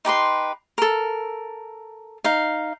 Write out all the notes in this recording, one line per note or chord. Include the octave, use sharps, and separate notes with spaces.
D#4 G4 B4 C6
A4 A#4
D#4 F5